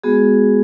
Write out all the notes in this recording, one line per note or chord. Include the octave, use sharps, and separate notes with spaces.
G#3 B3 F#4 G#4